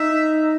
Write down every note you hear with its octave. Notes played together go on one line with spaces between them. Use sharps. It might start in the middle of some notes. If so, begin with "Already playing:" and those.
Already playing: D#4 E5